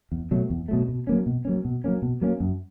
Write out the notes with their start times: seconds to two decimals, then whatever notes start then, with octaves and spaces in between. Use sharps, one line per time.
0.12 E2
0.31 B2 F#3 A3
0.50 E2
0.68 B2 F#3 A3
0.89 B2
1.07 F#3 A#3 C#4
1.26 B2
1.45 F#3 A#3 C#4
1.65 B2
1.84 F#3 A#3 C#4
2.02 B2
2.21 F#3 A#3 C#4
2.40 F#2